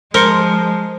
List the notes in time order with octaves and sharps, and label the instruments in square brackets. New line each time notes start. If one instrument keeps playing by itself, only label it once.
[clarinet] F3 [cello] G#3 [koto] A#4 [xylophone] C5 C6 C#7